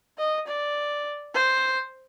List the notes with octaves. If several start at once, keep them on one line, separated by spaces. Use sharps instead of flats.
D#5
D5
C5